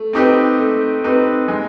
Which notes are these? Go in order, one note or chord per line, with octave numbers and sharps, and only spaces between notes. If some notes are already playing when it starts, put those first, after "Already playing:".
Already playing: A3
C4 D#4 G4 B4
A3
C4 D#4 G4 B4
G#3